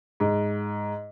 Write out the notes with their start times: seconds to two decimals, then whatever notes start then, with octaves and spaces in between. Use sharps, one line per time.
0.20 G#2